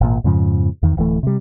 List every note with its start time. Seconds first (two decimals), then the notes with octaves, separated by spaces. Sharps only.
0.01 G#1 A#2
0.24 F2 G#2 C#3 F3
0.83 E2 D#3
0.97 D1 E3 A3
1.23 C3 G3